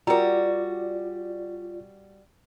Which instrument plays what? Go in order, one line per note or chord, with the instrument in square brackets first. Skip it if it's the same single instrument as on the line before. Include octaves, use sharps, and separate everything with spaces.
[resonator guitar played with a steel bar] G3 F#4 [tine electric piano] F4 D5 [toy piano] A#4 A#5